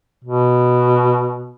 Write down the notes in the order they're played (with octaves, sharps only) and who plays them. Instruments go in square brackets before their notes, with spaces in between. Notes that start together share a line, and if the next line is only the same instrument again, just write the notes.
[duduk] B2